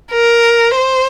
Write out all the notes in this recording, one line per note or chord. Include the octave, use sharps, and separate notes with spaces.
A#4
C5